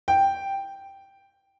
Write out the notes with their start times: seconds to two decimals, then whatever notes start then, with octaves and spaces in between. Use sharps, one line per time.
0.08 G5